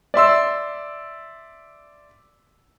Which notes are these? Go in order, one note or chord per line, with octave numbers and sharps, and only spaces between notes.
D5 E5 C6 E6